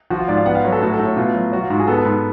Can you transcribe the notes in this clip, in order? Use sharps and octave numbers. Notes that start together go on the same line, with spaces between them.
F3 F#4
F4
G#2 D5
F5
B3 F#5
F5
F#3 C#5
A4
A2 F#4
A4
A2
C#5
B2 F4
F#3
F#3 F#4
F4
G#2 F#4
G#4
B3 A4
A4
G#2 B4